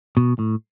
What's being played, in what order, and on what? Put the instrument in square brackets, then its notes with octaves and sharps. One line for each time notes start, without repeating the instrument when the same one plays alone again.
[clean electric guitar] B2
A2